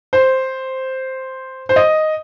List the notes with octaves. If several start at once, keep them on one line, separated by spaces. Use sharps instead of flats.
C5
C5
D#5